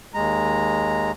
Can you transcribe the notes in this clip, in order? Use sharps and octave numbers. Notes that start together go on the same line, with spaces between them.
D#2 G#3 A#5